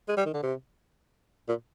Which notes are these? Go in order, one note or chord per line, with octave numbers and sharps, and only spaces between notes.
G#3
G3
D#3
D3
C3
A#2